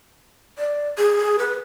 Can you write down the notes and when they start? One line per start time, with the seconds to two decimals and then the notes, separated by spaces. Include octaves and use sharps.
0.58 D5
0.98 G#4
1.39 B4